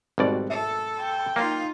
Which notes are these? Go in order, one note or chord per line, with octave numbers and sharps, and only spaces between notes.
G#1 B2 G3 C4 F#4 D5
A4 E5
G5
A#3 D#4 F4